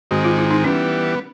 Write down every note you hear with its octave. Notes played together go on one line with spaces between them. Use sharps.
G#2 D#3 G#3 C4 F#4
F4
E4
D#4
E3 G3 B3 C#4